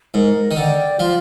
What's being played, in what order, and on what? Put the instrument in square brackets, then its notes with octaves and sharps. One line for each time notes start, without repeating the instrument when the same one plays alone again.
[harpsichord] G#2 [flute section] A#4
[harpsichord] D#3
[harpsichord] D3 [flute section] D5 G5
[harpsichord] F3 [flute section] F4